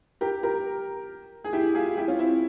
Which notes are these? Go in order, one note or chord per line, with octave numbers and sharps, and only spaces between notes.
G4 A#4
G4 A#4
G#4
E4 G4
F4 G#4
E4 G4
C#4 F4
C4 E4